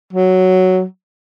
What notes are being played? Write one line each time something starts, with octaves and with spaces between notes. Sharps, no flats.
F#3